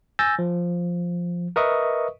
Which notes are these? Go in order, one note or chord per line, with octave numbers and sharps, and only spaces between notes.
G#5 E6 G6 A6 A#6
F3
A#4 B4 D#5 E5 C#6 D#6